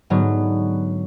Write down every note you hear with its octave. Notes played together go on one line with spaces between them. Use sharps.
G#2 D3 F#3 B3